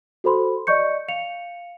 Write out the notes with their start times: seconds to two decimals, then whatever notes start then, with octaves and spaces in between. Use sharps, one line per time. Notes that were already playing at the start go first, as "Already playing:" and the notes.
0.24 F#4 A4 C5 B5 C6
0.67 D5 D#5 C#6 G6 C#7
1.08 F5 C#7 F7